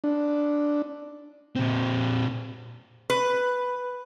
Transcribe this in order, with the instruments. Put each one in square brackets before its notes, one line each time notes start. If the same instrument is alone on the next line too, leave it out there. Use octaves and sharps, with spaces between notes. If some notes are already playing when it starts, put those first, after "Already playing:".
[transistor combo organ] D4
[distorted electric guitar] A#2 C4
[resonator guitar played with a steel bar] B4